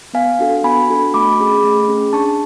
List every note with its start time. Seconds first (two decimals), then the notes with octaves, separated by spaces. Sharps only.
0.13 B3 F5 G#5
0.39 D4 F#4 A4
0.64 B3 G#5 B5
0.89 D4 F#4 A4
1.14 A3 B5 D6
1.39 C#4 G#4
1.64 A3
1.88 C#4 G#4
2.13 D4 A5 C#6